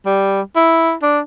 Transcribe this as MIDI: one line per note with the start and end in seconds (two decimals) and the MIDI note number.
0.06 0.41 55
0.56 0.93 64
1.03 1.20 62